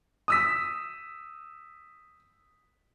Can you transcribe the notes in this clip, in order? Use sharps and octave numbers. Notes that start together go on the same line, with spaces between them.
D#6 E6 B6